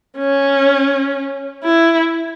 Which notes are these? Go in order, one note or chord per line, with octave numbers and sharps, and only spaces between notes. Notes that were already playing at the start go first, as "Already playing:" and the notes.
C#4
E4